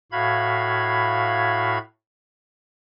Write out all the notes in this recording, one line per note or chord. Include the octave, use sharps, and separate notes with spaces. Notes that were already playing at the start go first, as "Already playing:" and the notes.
A2 F#4 F5 B5 G#6